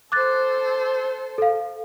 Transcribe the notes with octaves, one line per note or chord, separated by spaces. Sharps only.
A4 C5 D6 F#6 A6
A4 F5